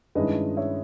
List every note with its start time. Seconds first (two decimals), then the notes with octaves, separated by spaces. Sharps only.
0.15 G2 D#3 G#3 C#4 E4 B4 D#5
0.57 C#5 E5